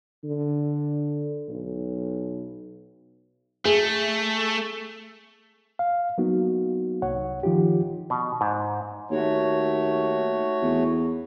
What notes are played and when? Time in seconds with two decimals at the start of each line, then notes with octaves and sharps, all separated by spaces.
0.24 D3
1.49 B1
3.65 A3 G#4
5.79 F5
6.18 F#3 A#3 B3 D#4 F#4
7.02 C2 C#5 F#5
7.43 D#3 F3 D#4 F4 G4
8.10 B2
8.41 G#2
9.11 D#2 A3 F#4 C#5
10.62 E2